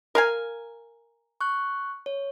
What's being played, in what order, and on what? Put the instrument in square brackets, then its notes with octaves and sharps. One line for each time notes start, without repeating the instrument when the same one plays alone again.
[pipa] A#4 F5 G#5
[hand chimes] C#6 F#6
C#5